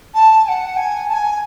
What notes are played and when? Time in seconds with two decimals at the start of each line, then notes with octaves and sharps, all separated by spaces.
0.14 A5
0.44 G#5
0.48 F#5
0.76 G#5
1.08 A5
1.12 G#5